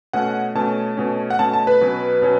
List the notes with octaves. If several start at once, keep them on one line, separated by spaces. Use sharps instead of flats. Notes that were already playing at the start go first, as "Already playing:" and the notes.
B2 A3 C#4 F#5
B2 A3 C#4 A5
B2 A3 C#4
F#5
B2 A3 C#4 A5
A5
B4
B2 F#3 C#4
B2 F#3 C#4